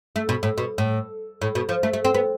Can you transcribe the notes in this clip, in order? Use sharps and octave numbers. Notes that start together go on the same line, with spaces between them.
A3
B2
A2
B2
A2
A2
B2
F3
A3
A3
C4
B3